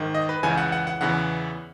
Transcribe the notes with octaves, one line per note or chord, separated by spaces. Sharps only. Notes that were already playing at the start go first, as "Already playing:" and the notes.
Already playing: G#2 D#3
D#5
B4
C#2 C#3 E3 G#5
F#5
F#5
F#5
E2 C#3 E3 F#5